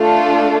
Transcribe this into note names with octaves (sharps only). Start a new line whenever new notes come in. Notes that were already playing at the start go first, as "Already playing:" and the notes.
Already playing: A3 D4 F4 A4